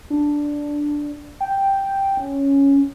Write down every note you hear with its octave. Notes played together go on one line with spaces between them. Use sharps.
D4
G5
C#4